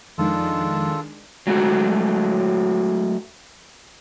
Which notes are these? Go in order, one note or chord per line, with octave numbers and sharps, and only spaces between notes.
F2 D#3 F3 G#3 D4 D#4 F4 A4
F#3 G#3 A3 F#4